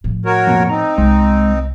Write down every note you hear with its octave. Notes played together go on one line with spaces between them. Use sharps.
A2 F3
F#4 A#4 C#5
F2 B2 A#3
C4 D#4 A#5
C2 G#3